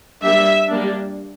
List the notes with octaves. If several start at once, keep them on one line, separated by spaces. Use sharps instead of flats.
G3 A#3 D4 E5
G3 A#3 D4